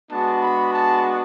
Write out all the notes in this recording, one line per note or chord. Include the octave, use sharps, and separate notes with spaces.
G#3 B3 D4 F#4 A5
B5
A5